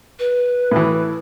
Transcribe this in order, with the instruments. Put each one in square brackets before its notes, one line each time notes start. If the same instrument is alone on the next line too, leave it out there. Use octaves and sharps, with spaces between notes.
[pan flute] B4
[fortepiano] A2 E3